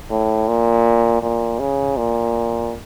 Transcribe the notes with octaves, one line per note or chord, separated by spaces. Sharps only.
A2
A#2
A#2
C#3
A#2